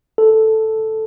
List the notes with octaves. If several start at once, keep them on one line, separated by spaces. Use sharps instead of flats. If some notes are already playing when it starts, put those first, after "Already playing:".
A4